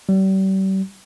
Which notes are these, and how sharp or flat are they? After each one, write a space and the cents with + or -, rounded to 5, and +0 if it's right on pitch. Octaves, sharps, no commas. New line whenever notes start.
G3 -40